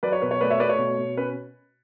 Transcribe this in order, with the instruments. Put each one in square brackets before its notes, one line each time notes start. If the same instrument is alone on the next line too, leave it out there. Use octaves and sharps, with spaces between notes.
[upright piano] F#3 B4 D5
C#5
B2 B4
C#5
A3 B4 D5
C#5 E5
A3 B4 D5
C#5
B2
B2
C#4 B4